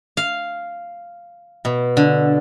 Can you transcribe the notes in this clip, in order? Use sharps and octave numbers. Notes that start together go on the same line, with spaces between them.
F5
B2
D3